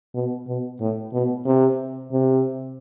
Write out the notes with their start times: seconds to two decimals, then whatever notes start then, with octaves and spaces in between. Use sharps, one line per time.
0.15 B2
0.47 B2
0.80 A2
1.13 B2
1.46 C3
2.12 C3